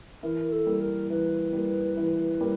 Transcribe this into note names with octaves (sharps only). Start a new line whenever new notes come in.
E3 A#4
A4
G3 A#3
A#4
E3 B4
G3 A#3
E3
G3 A#3